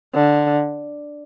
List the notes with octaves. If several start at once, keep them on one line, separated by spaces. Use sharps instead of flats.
D3